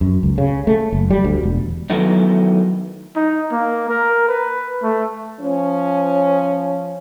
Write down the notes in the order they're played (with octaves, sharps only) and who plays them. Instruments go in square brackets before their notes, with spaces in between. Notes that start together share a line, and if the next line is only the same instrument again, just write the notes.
[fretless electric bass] F#2
C#2
C#3
A3
F#1
G3
D2
E1
[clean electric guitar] D#3 E3 F#3 A3 B3 D#4
[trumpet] D#4
A#3
A#4
B4
A3
[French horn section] F3 C#4